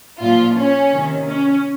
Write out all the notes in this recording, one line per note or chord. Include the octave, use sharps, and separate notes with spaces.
A#2 F3 F4
C#4
C3 D#3
C#4